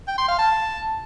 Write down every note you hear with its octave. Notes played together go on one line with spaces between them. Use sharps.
G5
C6
F5
A5